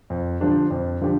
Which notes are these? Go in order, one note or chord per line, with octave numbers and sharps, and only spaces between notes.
F2
D3 F3 D4 G4
F2
D3 F3 D4 G4